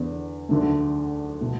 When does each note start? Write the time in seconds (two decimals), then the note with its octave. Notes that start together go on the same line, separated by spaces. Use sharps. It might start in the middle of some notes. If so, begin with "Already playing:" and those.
Already playing: E2 D3 B3
0.49 D2 D3 A3
1.41 B2 A3